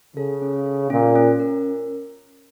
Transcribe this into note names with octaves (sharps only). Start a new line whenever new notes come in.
C#3 A4
C#4
A4
A#2 C#4
C#4
A#4